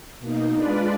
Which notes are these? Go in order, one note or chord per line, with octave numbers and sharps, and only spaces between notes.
B2 A#3 D#4
G#3 D4 F4 B4 D5